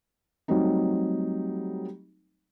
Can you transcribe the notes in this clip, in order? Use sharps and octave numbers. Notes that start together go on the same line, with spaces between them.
F#3 G3 A3 C4 D#4